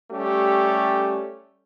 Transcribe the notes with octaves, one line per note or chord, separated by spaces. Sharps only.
G3 A3 C#4 G4